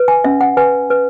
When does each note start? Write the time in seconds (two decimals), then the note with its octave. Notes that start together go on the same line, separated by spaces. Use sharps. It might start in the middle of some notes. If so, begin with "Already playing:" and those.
Already playing: B4
0.08 G#5
0.24 C#4 E5
0.41 F#5
0.57 B4 G#5
0.90 B4